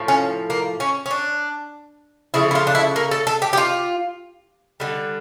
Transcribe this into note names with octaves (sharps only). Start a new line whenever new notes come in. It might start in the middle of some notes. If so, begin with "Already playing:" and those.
Already playing: A2 F3
C#4
A#3
C#4
C#4
D4
C#3 F3 A3 E4
E4
F4
D4
E4
A#3
A4
A4
G4
G4
F4
D3 G3